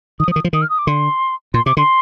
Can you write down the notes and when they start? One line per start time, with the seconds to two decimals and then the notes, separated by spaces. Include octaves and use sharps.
0.20 D#3 D#6
0.28 F3
0.31 D#6
0.36 D#3
0.44 F3
0.53 D#3 D#6
0.62 F6
0.70 D#6
0.78 D6
0.87 D3 C6
1.54 A#2 C6
1.66 C3 D6
1.77 D3 C6